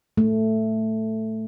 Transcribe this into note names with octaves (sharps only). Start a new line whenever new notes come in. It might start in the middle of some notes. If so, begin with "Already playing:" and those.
A3